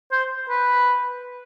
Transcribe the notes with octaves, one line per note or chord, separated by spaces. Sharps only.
C5
B4